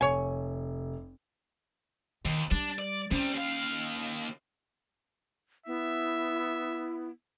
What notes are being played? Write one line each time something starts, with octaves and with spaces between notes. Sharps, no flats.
F1 C#5 G#5
D#2 D#3
G3 D4
D5
C3 G3 C#4
D#2 F5
B3 E4 E5